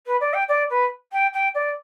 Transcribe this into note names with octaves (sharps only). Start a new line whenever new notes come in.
B4
D5
G5
D5
B4
G5
G5
D5